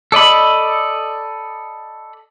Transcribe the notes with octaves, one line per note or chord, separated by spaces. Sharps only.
A4 D5 D#5 B5